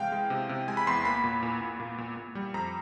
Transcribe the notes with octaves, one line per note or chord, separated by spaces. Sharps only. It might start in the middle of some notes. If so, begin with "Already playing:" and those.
Already playing: C3 E3 G#3 F5 G5
G#3
C3
C3
G#3 G#5
B5
E2 C6
A#3 B5
A#2
A#2
A#2
A#2
A#2
A#2
G3
F2 A#5